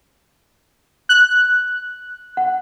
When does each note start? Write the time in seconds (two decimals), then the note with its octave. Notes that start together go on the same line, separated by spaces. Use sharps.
1.09 F#6
2.37 F#5